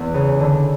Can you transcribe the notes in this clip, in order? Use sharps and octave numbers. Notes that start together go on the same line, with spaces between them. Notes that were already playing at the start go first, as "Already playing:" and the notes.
Already playing: E2
C#3
D3